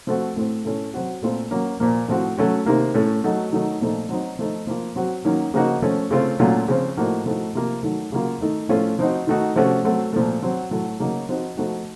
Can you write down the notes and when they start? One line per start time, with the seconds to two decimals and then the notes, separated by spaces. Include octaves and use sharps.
0.07 F3 A3 C4 F#4
0.36 A2 A3 C4
0.65 A2 A3 C#4
0.94 F#3 C4 F#4
1.23 A#2 A3 C4 F4
1.51 F#3 A#3 C#4
1.80 A#2 F3 A#3
2.08 A2 F3 C4 F#4
2.38 F#3 A3 C#4 F#4
2.66 C3 D#3 A#3
2.94 A2 A3 C#4
3.24 F#3 A3 D#4 F#4
3.52 D#3 F#3 A3 D#4
3.81 A#2 F3 A3 D#4
4.09 F#3 C4 D#4
4.39 F3 A3 D#4
4.67 F3 A#3 F4
4.96 F#3 C4 F#4
5.25 D#3 F#3 A#3 C#4
5.54 C#3 F3 A#3 D#4 F#4
5.82 F3 A3 C#4
6.11 C#3 A3 C4 F4
6.39 A#2 F#3 A3 C#4 F4
6.68 C#3 F3 C4
6.97 A2 F3 A#3 D#4 F#4
7.26 A2 F3 A3 D#4 F#4
7.55 C3 F3 A#3 F4
7.83 D#3 F#3 A3
8.12 C#3 F#3 A#3 F4
8.41 D#3 A3 D#4
8.69 A2 F3 A3 C#4 F4
8.99 F3 C4 D#4 F#4
9.27 D#3 A3 D#4 F#4
9.56 C3 F3 A3 C#4 F#4
9.84 F#3 A3 C4 F#4
10.13 A#2 F3 A3
10.43 F#3 C4 F#4
10.71 A2 F#3 A3
11.00 C#3 F#3 A#3 D#4
11.29 F3 C4 D#4 F#4
11.57 F3 A3 D#4 F#4